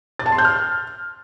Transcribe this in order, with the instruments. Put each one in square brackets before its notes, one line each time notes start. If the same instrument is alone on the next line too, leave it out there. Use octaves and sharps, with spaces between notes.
[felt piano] A6
A5
C6
G6
F6